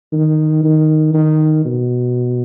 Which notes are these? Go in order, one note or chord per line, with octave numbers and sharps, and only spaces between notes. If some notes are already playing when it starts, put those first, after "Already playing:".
D#3
D#3
D#3
B2